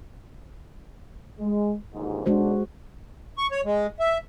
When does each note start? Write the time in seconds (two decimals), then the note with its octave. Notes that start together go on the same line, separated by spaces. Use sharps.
1.39 G#3
1.93 G1 D#2 G#2
2.26 B1 G#3 D4 F#4 C5
3.38 C#6
3.51 C#5
3.65 G#3
4.00 E5